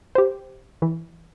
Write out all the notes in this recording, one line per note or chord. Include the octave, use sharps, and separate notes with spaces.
G4 C5
E3